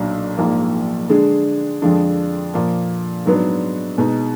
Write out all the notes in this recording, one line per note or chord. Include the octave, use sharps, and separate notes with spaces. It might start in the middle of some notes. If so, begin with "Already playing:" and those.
Already playing: B1 A#2 F#3 D4
A#1 G#2 F3 A#3
D3 G#3 D4 G#4
F2 D3 F3 G#3 D4
A#2 F3 A#3
G#2 F#3 B3 D4
B2 G#3 D#4